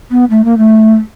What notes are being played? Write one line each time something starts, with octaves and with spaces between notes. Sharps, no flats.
B3
A3
A#3
A3